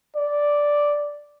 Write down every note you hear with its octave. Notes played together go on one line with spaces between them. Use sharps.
D5